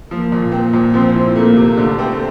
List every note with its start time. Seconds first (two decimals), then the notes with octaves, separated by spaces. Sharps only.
0.11 F3 A#3
0.32 A#2
0.52 C4
0.73 A#2
0.94 F3 C4
1.14 E4
1.36 A3 A#3
1.56 C3
1.77 D3 A3
1.99 C4